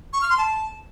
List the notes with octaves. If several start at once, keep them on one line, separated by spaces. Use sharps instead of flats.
C#6
F6
C6
A5